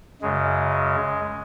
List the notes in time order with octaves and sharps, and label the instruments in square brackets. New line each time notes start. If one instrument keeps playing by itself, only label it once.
[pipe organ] F#2 C#3 G#3